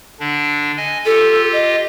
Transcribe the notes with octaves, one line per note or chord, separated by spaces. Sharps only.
D3 D4
D#5 G#5
F4 G4 A4
D#5